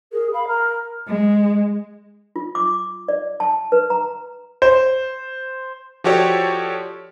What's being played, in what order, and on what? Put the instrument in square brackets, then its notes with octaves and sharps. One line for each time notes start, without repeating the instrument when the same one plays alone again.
[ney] G#4 [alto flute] A#4
[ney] F5 [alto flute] B5
[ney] A#4 [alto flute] A#5
[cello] G#3
[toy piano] F4
D6
D5
A5
B4
A#5
[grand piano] C5
[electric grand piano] F3 F#4 G4 A4 C#5 D5